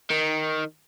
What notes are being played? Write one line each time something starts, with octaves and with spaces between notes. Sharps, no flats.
D#3